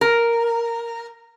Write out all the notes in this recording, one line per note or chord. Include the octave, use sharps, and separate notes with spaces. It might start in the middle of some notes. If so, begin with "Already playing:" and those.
A#4